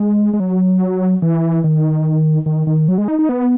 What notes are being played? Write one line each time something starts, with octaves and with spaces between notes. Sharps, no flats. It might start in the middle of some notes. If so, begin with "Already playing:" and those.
Already playing: G#3
G#3
F#3
E3
D#3
D#3
D#3
F#3
G#3
D#4
D#4
B3